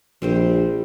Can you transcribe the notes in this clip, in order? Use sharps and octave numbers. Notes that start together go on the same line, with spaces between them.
A#1 G3 C4 C5